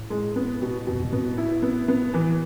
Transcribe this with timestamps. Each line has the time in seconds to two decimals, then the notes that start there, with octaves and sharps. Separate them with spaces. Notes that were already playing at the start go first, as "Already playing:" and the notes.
Already playing: A2
0.10 G#3
0.36 B3
0.62 B2
0.87 E2 B2
0.96 F2
1.04 G#2
1.12 A2 B3
1.38 E4
1.62 B3
1.88 B3
2.14 E3